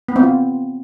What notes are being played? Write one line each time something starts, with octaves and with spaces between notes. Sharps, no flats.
B3
C4
F4